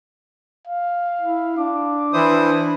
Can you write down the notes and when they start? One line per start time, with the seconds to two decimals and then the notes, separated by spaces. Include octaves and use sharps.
0.67 F5
1.21 E4
1.58 D4 D6
2.13 E3 E4 C5 D#6